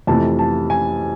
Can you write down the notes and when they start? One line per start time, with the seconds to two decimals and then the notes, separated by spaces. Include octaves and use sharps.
0.07 F2 C3 E3 A3 A5
0.39 A5
0.70 G#5